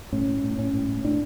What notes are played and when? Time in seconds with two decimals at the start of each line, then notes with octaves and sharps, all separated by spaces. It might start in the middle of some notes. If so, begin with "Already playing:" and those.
0.13 A2 C#4
0.27 A2
0.43 A2
0.58 A2 C#4
0.73 A2
0.89 A2
1.04 A2 D4